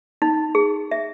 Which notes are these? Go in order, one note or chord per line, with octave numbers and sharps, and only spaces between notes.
D#4
G#4
E5